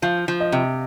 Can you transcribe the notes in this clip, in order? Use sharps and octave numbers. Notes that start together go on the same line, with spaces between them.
F3 F5
F3
D#5
C3